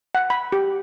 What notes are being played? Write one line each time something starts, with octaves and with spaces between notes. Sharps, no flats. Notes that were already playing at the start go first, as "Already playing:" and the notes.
F#5
B5
G4